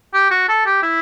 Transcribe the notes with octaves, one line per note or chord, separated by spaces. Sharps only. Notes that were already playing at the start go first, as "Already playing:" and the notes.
G4
F#4
A4
G4
E4